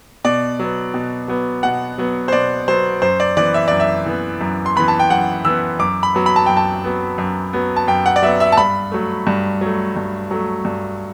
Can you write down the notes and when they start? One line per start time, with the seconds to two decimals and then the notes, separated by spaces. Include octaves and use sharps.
0.24 B2 D5
0.59 F#3 B3
0.94 B2
1.28 F#3 B3
1.63 B2 F#5
1.98 F#3 B3
2.28 C5
2.32 B2 D5
2.68 F#3 B3 C5
3.02 F#2 C5
3.20 D5
3.37 E3 B3 D5
3.54 E5
3.68 F#2 D5
3.80 E5
4.06 E3 B3
4.41 F#2
4.66 C6
4.76 E3 B3 B5
4.88 A5
4.99 G5
5.10 F#2 F#5
5.45 E3 B3 E6
5.79 F#2 D6
6.03 B5
6.15 F#3 B3
6.26 B5
6.36 A5
6.46 F#2 G5
6.57 A5
6.84 F#3 B3
7.18 F#2
7.53 F#3 B3
7.76 A5
7.87 F#2 G5
8.06 F#5
8.16 D5
8.22 F#3 B3 E5
8.40 E5
8.52 A5
8.57 G2 B5
8.91 F#3 A3
9.27 G2
9.61 F#3 A3
9.96 G2
10.31 F#3 A3
10.65 G2